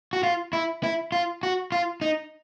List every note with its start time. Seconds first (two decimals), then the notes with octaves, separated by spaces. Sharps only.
0.13 F#4
0.23 F4
0.53 E4
0.83 E4
1.12 F4
1.43 F#4
1.72 F4
2.01 D#4